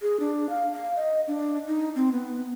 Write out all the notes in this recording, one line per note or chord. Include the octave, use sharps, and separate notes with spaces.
G#4
D4
F5
F5
D#5
D4
D#4
C4
B3